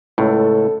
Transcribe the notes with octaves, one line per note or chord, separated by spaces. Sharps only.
C#2 A2 A4